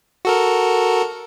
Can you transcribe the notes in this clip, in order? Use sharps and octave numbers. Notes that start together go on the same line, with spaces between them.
F#4 A4 A#4